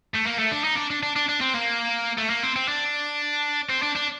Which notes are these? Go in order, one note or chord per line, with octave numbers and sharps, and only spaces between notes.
A3
A#3
A3
D4
D#4
D4
D4
D4
D4
D4
C4
A#3
A3
A#3
C4
C4
D4
C4
D4
D4